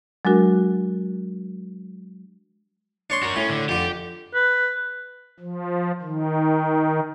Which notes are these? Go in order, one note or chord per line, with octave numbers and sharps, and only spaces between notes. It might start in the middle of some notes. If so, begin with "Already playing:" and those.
F#3 G#3 D4 F#4 A#4
D4 C#5 C6
F#4 A#4
A2 C#4
D3
F2 D3 G4
B4
F3
D#3